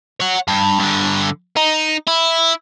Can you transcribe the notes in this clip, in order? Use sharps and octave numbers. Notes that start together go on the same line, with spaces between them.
C#5 F#5
G2
G2 D3
D#4
E4